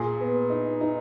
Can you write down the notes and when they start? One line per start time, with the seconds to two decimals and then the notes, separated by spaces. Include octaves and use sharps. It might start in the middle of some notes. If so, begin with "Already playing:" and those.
Already playing: A#2 G#4
0.20 B3
0.50 D#4
0.81 D#4